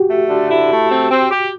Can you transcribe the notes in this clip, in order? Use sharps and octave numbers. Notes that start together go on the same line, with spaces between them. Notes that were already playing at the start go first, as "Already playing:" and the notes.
Already playing: F#4 G4
A3
D3
E4
A3
C4
C4
G4